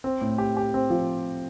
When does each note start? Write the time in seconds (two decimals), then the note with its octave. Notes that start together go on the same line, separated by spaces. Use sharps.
0.04 C4
0.21 A2
0.38 G4
0.57 G4
0.74 C4
0.90 F3